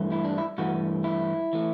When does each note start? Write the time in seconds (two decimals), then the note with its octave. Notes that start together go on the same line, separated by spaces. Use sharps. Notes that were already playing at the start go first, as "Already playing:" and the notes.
Already playing: G2 E3 A3
0.12 E4
0.24 D4
0.38 E4
0.58 G2 E3 A3 F#4
1.04 E4
1.53 E3 A3